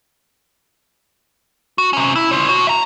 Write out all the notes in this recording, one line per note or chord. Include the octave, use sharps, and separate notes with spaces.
F#4
C3 C#4
E4
F4 C#5
B2 F#4
E5 A#5